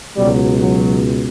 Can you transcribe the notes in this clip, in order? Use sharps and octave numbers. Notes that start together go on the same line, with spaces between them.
C#2 B2 F#3 G3
F#3